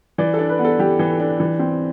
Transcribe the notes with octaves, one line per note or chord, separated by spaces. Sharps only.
E3 D5
A4
D4
B4
B3
A4
E3 G4
E3
D4
E3
C4